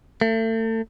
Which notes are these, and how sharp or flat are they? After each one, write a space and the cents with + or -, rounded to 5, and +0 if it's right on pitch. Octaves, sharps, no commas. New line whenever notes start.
A3 +35